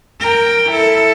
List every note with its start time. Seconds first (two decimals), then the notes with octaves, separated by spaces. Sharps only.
0.20 A#4 G5
0.70 E4 A4